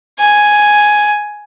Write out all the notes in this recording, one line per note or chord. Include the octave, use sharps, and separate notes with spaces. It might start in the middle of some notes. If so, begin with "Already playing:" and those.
G#5